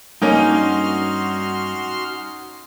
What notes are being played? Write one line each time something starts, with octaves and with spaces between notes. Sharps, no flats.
G2 A#3 C#4 D#4 F#4 C6 F6